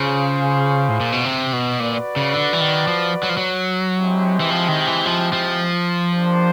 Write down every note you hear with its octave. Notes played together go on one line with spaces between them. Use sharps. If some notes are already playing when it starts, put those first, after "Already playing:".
Already playing: C#3 F4 G#4 C5 F5
A2
A#2
B2
C3
B2
A#2 F#4 B4 D5
C#3
D3
E3
D#3
F3
F#3
F3
F#3
G#3 C4 E4 G4
E3
F3
D#3
E3
F3
F3
A#3 D4 G4 C5